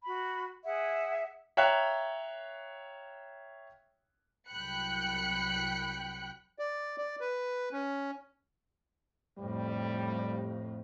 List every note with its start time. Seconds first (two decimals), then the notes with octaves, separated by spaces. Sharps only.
0.04 F#4 B5
0.65 G#4 E5 F#5
1.57 C#5 E5 F5 G5 A#5 F#6
4.49 C2 F#3 G5 B5 F#6 C#7
6.59 D5
6.98 D5
7.21 B4
7.72 C#4
9.39 F2 A2 G3